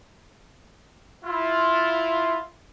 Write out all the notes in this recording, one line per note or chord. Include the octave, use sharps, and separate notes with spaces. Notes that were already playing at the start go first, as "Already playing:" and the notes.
E4 F4